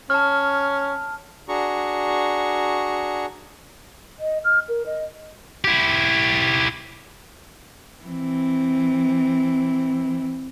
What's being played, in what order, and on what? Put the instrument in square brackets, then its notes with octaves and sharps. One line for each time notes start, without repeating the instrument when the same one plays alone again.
[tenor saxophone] C#4 [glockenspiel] A5 F6
[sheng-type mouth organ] D4 F#4 G#4 A#5 C#6
[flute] D#5
F6
A#4
D#5
[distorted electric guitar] E4 G4
[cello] E3 C4